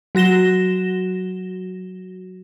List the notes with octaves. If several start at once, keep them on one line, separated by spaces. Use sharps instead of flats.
F#3 F#4 A#6 E7 G7